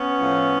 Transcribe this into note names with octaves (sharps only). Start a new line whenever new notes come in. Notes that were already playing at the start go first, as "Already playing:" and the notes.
Already playing: B3 C#4
A2 F3